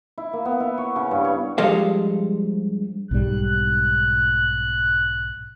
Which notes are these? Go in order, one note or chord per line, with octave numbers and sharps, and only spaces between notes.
E4
A#3
B3
E4
C#5
C#3
G2
C#5
G2 F3 G#3 A4 C5 F5
B1 G#2 G3 F#6